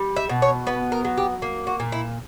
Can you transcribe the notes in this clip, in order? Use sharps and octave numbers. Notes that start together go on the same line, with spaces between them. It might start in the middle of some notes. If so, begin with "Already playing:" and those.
Already playing: G3
E5
B2
C#5
B3 B4
A#4
F#3
G4
A#3
F#4
A#2
E4